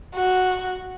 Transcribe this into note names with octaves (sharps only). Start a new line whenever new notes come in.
F#4